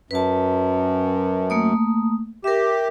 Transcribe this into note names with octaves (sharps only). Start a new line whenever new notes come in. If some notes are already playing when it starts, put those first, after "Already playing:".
F#2 B4 A5
A3 A#3 D#6
G4 A#4 E5